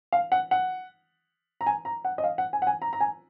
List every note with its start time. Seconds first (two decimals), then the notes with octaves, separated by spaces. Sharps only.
0.12 F5
0.32 F#5
0.51 F#5
1.61 A#5
1.67 G#5
1.85 A#5
2.05 F#5
2.18 D#5
2.24 F5
2.38 F#5
2.53 G#5
2.62 F#5
2.67 G#5
2.82 A#5
2.93 A#5
3.00 G#5